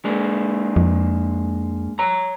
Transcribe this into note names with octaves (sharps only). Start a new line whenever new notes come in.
G#3 A#3 D4
F2
C#5 A#5